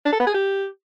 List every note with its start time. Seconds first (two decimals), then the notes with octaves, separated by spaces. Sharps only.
0.05 D4
0.13 A4
0.20 B3
0.27 G#4
0.34 G4